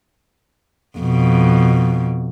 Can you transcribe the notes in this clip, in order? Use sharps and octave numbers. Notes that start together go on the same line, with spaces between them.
F2 B2